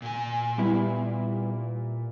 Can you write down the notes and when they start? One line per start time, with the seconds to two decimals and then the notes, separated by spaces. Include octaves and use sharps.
0.02 A#2 G#5
0.58 G3 B3 E4